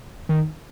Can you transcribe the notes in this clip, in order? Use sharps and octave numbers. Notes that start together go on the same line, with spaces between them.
D#3